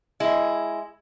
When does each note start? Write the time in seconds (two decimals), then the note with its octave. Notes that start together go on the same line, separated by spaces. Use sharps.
0.20 G#3 E4